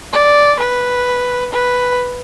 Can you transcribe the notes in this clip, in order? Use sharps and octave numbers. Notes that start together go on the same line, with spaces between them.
D5
B4
B4